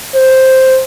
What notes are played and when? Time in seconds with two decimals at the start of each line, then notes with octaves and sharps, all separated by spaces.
0.15 C5